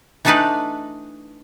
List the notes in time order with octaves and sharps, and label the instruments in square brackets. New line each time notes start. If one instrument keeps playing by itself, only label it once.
[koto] E3 A3 D4 D#4 B4 D5